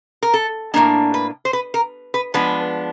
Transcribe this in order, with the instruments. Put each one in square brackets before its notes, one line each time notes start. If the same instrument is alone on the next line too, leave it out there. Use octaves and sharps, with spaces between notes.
[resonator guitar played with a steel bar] A#4
A4
A2 F3 A#3 D4 A#4
B4
C5
B4
A#4
B4
F3 G#3 B3 D4 B4